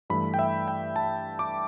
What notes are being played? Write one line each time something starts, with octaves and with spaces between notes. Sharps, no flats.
G2 E3 A3 B5
G5
E5
G5
A5
D6